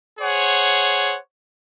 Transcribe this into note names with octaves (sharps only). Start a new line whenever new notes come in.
G#4 C5 C#5 F#5